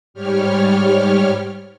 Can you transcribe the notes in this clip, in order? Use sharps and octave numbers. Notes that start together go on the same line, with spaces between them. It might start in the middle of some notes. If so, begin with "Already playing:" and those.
G#2 G3 G4 C#5 F6